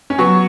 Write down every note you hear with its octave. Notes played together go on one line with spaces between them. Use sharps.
C#4
F#3 B3 C#6